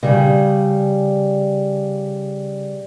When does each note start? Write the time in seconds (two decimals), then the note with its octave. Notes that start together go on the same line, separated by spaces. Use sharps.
0.03 C#3 G3